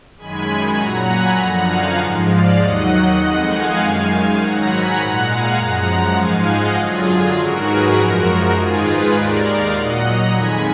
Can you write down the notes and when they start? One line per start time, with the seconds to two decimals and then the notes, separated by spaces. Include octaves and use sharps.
0.18 F#2 D#3 G#3 G#5 B5
0.77 A#2 F#3 F#5 A#5
1.07 G#5 B5
1.37 F#2 D3 F3 F#5 A#5
1.67 F5 G#5
1.97 G#2 F3 G#3
2.27 D5 F5
2.57 D#2 D#3 F#3 D#5 F#5
2.86 D#5 F#5
3.16 F2 D#3 G#3 D#5 F#5
3.46 F5 G#5
3.76 F#2 D#3 G#3
4.36 G#2 D#3 F#3 F#5 A#5
4.65 G#5 B5
4.95 A#2 G#3 F#5 A#5
5.25 F5 G#5
5.55 F#2 F3 G#3 F#5 A#5
6.15 G#2 F3 G#3 F5 G#5
6.45 D#5 F#5
6.74 F#2 D3 F#3 F4 G#4
7.34 G#2 D#3 F#3 F#4 A#4
7.64 G#4 B4
7.93 F#2 F3 G#3 F#4 A#4
8.53 G#2 D#3 G#3 F4 G#4
8.84 G#4 B4
9.13 D#2 D#3 G#3 A#4 D5
9.44 D5 F5
9.73 A#2 F#3 D#5 F#5
10.03 F#5 A#5
10.33 F2 D#3 G#3 G#5 B5